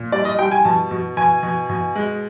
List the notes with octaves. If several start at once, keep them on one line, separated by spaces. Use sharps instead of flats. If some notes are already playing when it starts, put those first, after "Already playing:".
Already playing: A#2
G3 D5
D#5
G3 G5
G#5
B2 A5
B2
B2 G#5
B2
B2
G#3